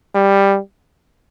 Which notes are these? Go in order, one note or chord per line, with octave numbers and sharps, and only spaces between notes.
G3